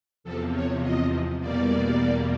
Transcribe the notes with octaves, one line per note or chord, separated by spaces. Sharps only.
E2 C3 F3 A4
C#5
D#5
E2 B2 G3 A#3 D5